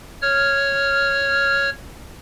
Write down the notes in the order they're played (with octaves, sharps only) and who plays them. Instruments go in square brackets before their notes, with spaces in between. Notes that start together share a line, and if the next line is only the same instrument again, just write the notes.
[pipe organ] C#5 F6